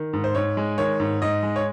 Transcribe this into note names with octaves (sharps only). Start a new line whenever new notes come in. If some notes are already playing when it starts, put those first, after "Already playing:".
Already playing: D#3
G#2
C5
G#2 C#5
G#3
D#3 C#5
G#2
G#2 D#5
G#3
C#5